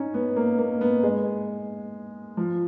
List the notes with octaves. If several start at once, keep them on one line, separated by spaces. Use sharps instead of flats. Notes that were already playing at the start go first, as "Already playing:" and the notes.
Already playing: C#4 D#4
B3
A#3
A#3
B3
G#3
F3